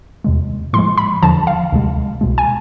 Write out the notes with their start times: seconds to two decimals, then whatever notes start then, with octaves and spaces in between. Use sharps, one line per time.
0.24 E2 C3 G#3
0.73 A2 F3 G#3 C6
0.98 B5
1.22 E2 D3 F3 A5
1.47 F5
1.72 D2 C3 G#3
2.21 C2 B2 G#3
2.38 G#5